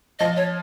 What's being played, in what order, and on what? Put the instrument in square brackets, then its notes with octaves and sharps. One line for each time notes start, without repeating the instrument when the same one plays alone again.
[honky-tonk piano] F3 [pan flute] D#5
[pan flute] C#5